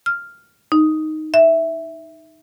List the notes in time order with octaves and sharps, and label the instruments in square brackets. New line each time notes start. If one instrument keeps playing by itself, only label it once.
[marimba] F6
D#4
E5